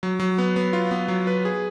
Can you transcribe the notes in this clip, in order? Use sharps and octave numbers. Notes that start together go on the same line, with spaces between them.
F#3
F#3
B3
B3
F4
B3
F#3
B4
G#4